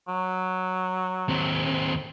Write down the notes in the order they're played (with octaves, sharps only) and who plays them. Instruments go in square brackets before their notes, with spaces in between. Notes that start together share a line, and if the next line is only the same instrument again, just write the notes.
[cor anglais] F#3
[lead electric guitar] D#2 C4